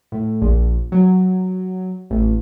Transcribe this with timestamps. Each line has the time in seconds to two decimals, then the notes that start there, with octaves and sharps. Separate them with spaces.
0.12 A2
0.42 A#1
0.92 F#3
2.10 A1